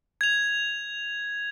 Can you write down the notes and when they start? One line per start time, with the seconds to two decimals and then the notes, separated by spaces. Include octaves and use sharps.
0.21 G#6 F7